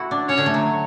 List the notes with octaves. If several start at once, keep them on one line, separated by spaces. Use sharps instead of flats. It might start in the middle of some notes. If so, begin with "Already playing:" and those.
Already playing: A3 E4 F#4
D4
C#4 C#5
D3
A3
F#3